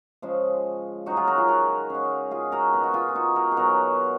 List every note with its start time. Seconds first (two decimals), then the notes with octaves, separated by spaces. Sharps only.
0.22 C#3 F3 G#3
1.06 C#3 F#3 D#4 F#4
1.17 F4 G#4
1.27 F#4 A#4
1.38 F4 G#4
1.48 F#4 A#4
1.90 C#3 G#3
2.31 F4 G#4
2.52 F#4 A#4
2.73 B2 G#3 G#4
2.84 F#4
2.94 F4 G#4
3.09 G#4
3.15 D#4 F#4
3.36 F#4 A#4
3.52 G#4
3.57 B2 F#3 F#4 A#4